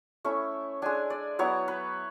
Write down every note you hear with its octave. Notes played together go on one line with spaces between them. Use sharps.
A3 C#4 E4 E5
G#3 D4 G#5
D5
F#3 B3 E4 C#5
B4